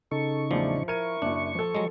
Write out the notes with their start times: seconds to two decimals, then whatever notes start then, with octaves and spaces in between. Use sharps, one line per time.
0.11 C#3 D#4 A4 C#6
0.51 E2 A2 F3 D4
0.88 E4 A#4 C#6 G#6 D#7
1.22 F#1 F#2 D4
1.55 F3 A4
1.75 F#3 G#3